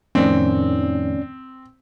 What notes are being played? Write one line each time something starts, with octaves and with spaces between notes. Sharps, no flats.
F2 A2 D#3 C4 C#4 D5